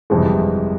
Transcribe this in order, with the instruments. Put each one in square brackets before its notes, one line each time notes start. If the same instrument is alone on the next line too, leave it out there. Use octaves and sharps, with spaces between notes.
[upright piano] G1 F2 C3 E3 G#3